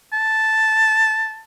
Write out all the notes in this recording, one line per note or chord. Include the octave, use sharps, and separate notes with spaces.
A5